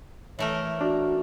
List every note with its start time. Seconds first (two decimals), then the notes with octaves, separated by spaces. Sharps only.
0.39 E3 A3 A#4 C#5
0.81 D4 F#4